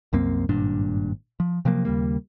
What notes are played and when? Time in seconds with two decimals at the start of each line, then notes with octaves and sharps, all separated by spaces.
0.13 C2 F#2 A#3 C4
0.49 G#1 G2 A#2 D4
1.40 F3
1.65 C3 F3 F#3 A#3
1.85 D#2 C#3 G3 A#3